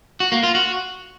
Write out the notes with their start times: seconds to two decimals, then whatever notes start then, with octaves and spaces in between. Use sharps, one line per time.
0.20 F#4
0.32 A#3
0.43 F4
0.55 F#4